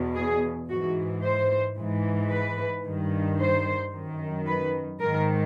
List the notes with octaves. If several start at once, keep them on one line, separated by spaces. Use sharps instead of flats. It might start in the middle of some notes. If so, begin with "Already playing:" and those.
Already playing: E2 B2
G#4
G#2 E3 F#4
C5
G#2 E3
B4
G2 D#3
C5
F#2 D#3
B4
G#2 D#3 A#4